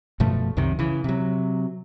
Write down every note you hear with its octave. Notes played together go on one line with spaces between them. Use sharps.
F#2 B2 F3 A3
C2 F#2 C3 D#3
C#3 E3
C3 F#3